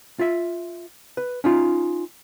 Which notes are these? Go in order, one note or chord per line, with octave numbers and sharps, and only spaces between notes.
F4 E5
B4
C#4 D#4 F4